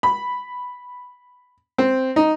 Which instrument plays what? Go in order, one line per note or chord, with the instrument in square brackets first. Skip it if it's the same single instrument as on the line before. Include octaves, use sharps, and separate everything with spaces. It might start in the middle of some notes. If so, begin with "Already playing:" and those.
[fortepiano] B5
C4
D#4